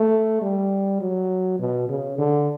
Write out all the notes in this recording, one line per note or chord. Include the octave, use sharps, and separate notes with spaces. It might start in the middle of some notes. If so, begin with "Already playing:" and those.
Already playing: A3
G3
F#3
B2
C#3
D3